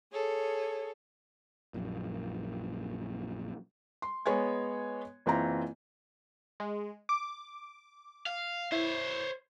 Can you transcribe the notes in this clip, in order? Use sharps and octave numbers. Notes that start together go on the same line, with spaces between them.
G#4 A4 C#5
A#1 F#2 A#2
C6
G#3 B3 C#5 G#5 G#6
F#1 E3 C4 F4 A#5
G#3
D6
F5
E4 C5 C#5